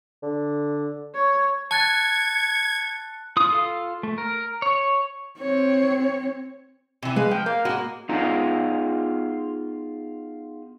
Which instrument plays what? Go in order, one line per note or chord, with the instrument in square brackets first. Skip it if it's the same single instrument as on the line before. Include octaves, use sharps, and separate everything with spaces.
[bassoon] D3
[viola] C#5
[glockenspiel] A5 F#6 A6 [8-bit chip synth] G#6 [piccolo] C#7
[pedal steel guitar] F4 D#6
F4 A4 F5
A3
A#4
C#5
[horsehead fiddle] C4 C#5
[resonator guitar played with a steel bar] C3 E3
[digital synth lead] G#3 [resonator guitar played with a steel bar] B4 F5
[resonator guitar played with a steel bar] F3 [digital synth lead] G5
[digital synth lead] A#3 [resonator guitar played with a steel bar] F5
[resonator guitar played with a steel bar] A2 G#3 F#4
[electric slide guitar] B3 D#4 F4 G#4 A#5